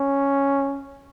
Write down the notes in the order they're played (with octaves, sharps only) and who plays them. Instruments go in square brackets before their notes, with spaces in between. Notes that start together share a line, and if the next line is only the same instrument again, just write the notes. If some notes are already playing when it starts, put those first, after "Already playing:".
Already playing: [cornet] C#4